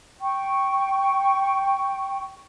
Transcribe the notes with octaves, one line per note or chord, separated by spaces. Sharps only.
G5 C#6